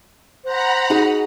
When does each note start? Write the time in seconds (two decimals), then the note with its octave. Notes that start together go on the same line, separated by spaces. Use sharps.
0.44 C5 F#5 A#5 B5
0.90 D#4 F#4 G#4